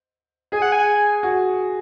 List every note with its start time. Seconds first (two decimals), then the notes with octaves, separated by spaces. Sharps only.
0.52 G#4 G#5
0.62 F#5
0.72 G#5
1.23 F#4